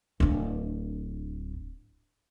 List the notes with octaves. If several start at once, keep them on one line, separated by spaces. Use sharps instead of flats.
D1 D4